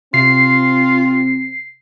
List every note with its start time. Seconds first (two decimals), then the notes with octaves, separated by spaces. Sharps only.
0.14 C3 C4 F4 C7